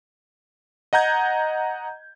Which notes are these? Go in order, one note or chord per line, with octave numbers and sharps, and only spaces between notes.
D#5 F#5 A#5 G6 G#6